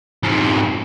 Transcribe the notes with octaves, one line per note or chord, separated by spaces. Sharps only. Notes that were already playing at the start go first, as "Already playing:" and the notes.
F2 G#2